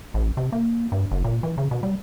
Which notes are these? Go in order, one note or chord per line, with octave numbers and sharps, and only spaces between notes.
A1
C3
A#3
G2
F#1
A#2
E3
C#3
B2
G3